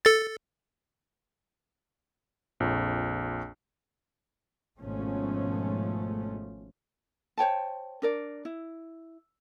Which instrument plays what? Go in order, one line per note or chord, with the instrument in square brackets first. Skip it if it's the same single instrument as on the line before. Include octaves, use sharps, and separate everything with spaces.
[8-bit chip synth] A4 A6
[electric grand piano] A#1 F2
[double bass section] G#1 B2 F3 G#3 A3 C#4
[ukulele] C5 C#5 G5 A5
D4 A#4 D5
E4